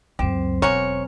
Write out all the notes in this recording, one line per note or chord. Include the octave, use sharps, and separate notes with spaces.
C#2 F#2 F#3 C4 G4 C5
E1 C#4 F#4 A#4 C#5